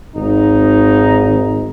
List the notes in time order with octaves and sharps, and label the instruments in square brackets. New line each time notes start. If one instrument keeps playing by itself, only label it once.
[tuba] G#1 [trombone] D#4